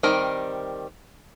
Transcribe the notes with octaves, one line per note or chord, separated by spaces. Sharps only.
D#3 G3 C4 A#4